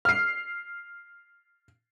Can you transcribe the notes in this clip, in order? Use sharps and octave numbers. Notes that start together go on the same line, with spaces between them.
F6 C7